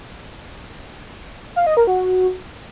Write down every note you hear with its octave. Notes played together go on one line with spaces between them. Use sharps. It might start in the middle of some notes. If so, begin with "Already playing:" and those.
F5
D#5
A#4
F#4